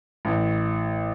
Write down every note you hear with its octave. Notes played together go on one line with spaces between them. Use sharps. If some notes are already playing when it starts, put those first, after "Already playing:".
A1